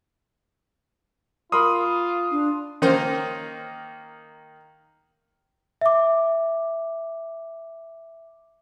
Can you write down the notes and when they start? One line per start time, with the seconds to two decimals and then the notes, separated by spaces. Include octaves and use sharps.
1.52 F4 A#4 B5 C6 D#6
2.31 D4
2.82 D#3 A#3 C#4 A#4 C5
5.81 E5 D6